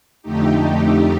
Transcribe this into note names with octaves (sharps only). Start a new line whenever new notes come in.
F2 D3 A3 D#4 G4